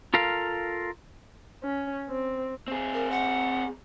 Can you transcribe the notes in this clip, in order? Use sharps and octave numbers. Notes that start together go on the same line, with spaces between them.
F4 A4 A#4 F5
C#4
C4
C4 G#4
A#4
F#5